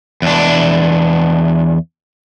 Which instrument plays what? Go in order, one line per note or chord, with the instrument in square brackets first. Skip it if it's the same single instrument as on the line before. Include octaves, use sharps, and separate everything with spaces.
[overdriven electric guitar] E2 D4